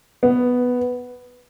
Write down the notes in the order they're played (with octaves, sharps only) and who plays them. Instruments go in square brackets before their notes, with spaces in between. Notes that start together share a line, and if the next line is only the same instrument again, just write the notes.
[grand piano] B3